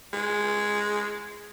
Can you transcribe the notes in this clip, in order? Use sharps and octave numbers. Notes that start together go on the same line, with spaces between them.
G#3